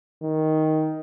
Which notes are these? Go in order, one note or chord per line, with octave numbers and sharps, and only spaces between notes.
D#3